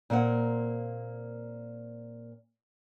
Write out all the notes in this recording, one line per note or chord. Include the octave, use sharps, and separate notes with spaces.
A#2 A#3 C4 F#5